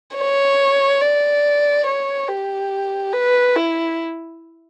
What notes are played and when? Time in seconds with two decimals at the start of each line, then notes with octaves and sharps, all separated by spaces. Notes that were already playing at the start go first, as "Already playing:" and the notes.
0.16 C#5
1.01 D5
1.87 C#5
2.28 G4
3.13 B4
3.56 E4